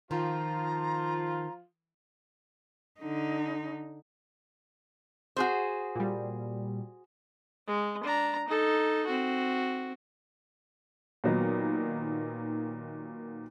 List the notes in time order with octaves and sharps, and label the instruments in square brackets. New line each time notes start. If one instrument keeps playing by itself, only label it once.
[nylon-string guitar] D#3 [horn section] F3 F4 [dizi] A#5
[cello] D3 D#4
[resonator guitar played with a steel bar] F#4 G#4 C5
[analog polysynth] A#2 G3
[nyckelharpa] G#3
D4 A#5
D#4 A4
C4 F#4
[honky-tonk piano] A#2 D#3 F#3 B3 D#4